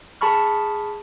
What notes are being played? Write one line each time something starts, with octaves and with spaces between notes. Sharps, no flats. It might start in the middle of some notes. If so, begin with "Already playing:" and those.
G#4 A5 B5 C#6 F6